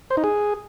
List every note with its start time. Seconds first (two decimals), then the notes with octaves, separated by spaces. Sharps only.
0.10 C5
0.17 D#4
0.24 G#4